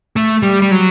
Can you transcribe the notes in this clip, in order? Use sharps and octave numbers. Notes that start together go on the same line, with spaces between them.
A3
G3
G3
F#3